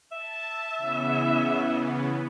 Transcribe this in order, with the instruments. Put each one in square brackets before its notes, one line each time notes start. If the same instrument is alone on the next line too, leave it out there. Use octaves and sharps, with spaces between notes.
[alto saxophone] E5 [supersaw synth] A5
[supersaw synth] C#3 E3 B3